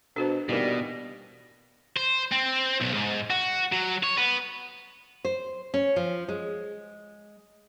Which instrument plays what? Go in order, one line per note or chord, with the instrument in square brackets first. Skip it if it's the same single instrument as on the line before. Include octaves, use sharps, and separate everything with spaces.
[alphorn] B2 [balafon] D4 F#4 C5 [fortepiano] A4
[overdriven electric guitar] B2 [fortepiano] D#3 E3 A#3 [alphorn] G3
[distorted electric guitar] C5
C4
B1
G#2
F#4
F#3
C#5
B3
[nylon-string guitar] C5
C#4
F3
G#3